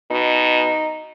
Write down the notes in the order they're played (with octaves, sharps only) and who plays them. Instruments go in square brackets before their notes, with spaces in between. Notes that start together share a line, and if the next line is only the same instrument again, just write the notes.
[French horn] B2 [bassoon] D#4